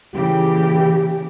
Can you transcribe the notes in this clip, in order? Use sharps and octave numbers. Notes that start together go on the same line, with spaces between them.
A#2 C#3 E3 G4